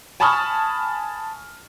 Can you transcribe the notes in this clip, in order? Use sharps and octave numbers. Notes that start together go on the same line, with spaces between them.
G#5 A5 B5 C#6 D#6 F6